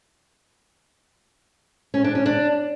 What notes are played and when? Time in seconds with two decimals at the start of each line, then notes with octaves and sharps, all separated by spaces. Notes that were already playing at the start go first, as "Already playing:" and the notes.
1.94 C#4
2.04 D4
2.15 C#4
2.26 D4